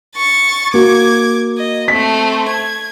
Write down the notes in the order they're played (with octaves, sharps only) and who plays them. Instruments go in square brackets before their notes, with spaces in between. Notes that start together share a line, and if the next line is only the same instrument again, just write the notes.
[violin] C#6 A6
[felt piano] A#3 F#4 [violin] D6 G#6
[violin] D#5
[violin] A3 C4 [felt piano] B6
[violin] G#6